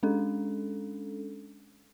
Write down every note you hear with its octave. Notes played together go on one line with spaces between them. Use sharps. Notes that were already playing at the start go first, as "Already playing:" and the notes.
G#3 C#4 D4 A4